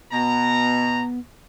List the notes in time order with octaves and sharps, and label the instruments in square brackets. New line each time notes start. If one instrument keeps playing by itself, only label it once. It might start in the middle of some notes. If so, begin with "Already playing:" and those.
[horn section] B2 A#5 [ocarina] B3